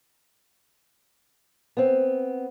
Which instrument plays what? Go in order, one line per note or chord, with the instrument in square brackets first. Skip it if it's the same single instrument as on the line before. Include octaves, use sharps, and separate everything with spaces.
[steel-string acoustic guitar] B3 C4